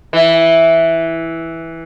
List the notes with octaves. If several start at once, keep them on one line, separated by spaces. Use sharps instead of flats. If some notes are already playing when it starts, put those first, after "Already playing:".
E3